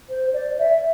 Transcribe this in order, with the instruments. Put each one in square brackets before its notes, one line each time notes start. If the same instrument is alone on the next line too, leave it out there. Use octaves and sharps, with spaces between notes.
[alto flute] C5
D5
E5